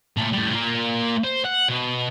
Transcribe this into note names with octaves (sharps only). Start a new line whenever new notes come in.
A#2 A3
A2 G3
A#3 F4
C5
F#5
B2